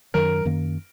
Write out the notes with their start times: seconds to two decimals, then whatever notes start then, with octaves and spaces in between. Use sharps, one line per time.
0.14 F#2 D#3 F#3 A#4
0.45 F#2 D#3 A#3